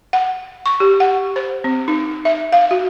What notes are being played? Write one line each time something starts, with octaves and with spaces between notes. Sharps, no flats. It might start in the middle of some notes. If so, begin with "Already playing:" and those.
F#5
C#6
G4
F#5
C5
C4
D#4
E5
F5
F#4